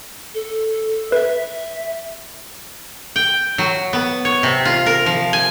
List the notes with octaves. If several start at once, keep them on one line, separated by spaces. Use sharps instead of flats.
A4
B4 E5
G5
F#3
B3
C#5
C3
F4
A#4
F3
G#5